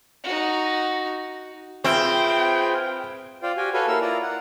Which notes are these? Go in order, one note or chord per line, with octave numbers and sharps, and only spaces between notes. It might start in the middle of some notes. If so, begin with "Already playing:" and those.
D#4 F#4
C4 F4 G#4 B4 E5 G5
F4 C5 D5 F5 G5
F#4 G4 G5 G#5
F#4 A4 B4 C#5 F5 G#5
A#3 E4 A#4 F5 E6
E4 F4 D5 A#5
F#5